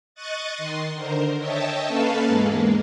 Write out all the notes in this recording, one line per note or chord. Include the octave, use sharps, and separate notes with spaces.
D#5 C#6 D#6 F#6 A6
D#3 C6
D3 A#4 C5
C#5 D#5 E5 G5 A5
A#3 C#4 A4 B4 F5 A5
E2 G#2 G#3 A#3